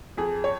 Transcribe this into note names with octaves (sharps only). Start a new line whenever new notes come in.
F2 G#4
C#5